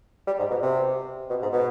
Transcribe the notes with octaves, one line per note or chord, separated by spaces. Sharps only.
G3
G#2
B2
C3
B2
G#2
B2